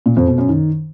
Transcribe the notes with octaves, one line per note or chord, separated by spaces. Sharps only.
A#2
F2
B2
F#2
D#3